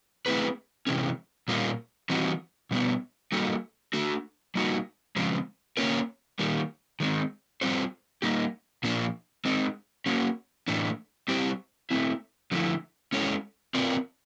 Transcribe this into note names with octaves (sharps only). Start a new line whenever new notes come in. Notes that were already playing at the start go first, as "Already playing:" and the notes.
A3 C4 E4 G#4 B4
C3 E3 G#3 C#4
A#2 G3 A#3 C#4 F4
E3 G3 C4 D#4 F#4
B2 G3 B3 D4
G3 A#3 D#4 F#4 A4
A3 D4 F#4 A4
G3 A#3 D#4 F#4
C#3 F3 G#3 C4
A#3 C#4 F4 A#4 C#5
D#3 G3 A#3
D#3 G#3 C4
G3 C4 F4 A4 C5
G3 A#3 D#4 G4
A#2 F3 A#3 D4 F4
G#3 C4 D#4
A#3 C#4 F#4
A2 E3 A3 D4
G3 C4 E4 G4 C5
A3 C4 E4
D3 F3 A3 C#4 E4
G#3 C#4 E4 A4 C#5
C4 F4 A#4 D5